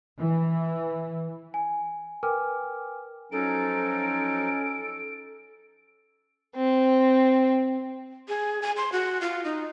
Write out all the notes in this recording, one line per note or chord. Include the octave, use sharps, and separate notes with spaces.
E3
G#5
A#4 B4 G5 G#5 D6 F6
F3 F#3 C#4 D#4 A4 D7
C4
G#4
G#5
C6
F#4
F4
D#4